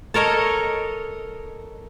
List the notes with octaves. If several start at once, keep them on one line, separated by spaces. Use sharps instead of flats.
A4 A#4 C#5 D#5